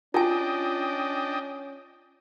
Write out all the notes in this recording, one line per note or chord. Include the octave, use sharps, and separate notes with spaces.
C#4 D4 F4 D#5 G5 G#5